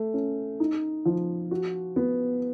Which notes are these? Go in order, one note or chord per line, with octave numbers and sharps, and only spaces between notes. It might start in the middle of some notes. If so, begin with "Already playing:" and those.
Already playing: A3
C#4
D#4
F3
F#4
B3